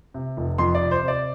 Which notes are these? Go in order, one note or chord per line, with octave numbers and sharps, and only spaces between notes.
C3
F1
F2 C6
D5
C3
C5
C3 D5